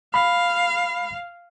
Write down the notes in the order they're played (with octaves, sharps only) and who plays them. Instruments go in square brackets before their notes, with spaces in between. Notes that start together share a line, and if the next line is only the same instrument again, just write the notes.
[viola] F5 [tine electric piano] B5